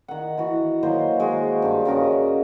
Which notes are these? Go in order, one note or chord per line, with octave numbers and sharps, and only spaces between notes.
D#3 F#5
E3 F#4
D#3 F#3 A#3 C5
G#3 F#4
G2 G4 F5
C#3 F#4 A#4 D#5